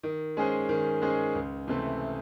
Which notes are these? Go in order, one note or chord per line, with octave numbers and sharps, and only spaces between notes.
D#3
G#3 C#4 G#4 C5
D#3
G#3 C#4 G#4 C5
C#2
C3 E3 A3 C4